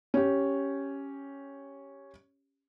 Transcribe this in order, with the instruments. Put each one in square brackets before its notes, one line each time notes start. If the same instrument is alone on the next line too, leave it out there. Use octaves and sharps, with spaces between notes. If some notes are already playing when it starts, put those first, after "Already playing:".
[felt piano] C#4 G4